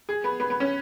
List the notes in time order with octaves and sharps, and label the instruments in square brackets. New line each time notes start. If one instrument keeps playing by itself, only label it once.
[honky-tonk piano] G#4
B3
B3
B3
C#4